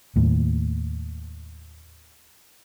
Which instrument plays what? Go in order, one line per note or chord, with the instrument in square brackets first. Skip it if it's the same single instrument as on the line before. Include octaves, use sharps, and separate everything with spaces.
[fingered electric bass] D#2 A2